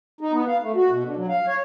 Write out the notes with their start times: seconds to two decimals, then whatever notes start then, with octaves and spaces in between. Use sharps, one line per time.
0.21 D#4
0.33 B3
0.48 F5
0.62 A3
0.76 F#4
0.90 B2
1.03 D3
1.17 F#3
1.29 F5
1.47 C#5